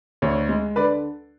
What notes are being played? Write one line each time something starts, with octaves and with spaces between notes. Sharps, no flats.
D2 C#5
G#3
D3 B4 D5